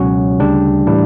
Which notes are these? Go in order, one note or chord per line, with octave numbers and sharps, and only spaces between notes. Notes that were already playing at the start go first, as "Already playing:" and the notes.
Already playing: C#2 B2 F#3 C#4 F#4
D2 C#3 G3 D4 G4
A2 E3 G3 D4